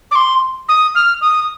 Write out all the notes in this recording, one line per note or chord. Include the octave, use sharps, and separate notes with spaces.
D6
C6
D#6
F6
D#6